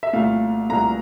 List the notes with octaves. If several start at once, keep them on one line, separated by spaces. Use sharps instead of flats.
E5
C2 A#2 A3 F5
C2 A#2 A3 A#5